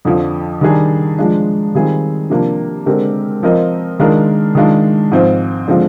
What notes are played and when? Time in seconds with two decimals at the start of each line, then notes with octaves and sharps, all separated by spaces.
0.05 F2 D3 F3
0.61 D#3 G3 D4 G#4
1.19 F3 G#3 D4 F4
1.74 D#3 G3 C4 F4 G#4
2.30 C3 F3 A#3 D4 F4
2.86 D3 G#3 C4 G4 A#4
3.43 F3 C4 F4 A#4 D#5
3.99 D#3 G#3 D4 F4 A#4
4.55 D#3 G#3 D4 F4
5.12 G#2 F3 C4 F4 C5
5.68 D3 F3 G#3 C4 F4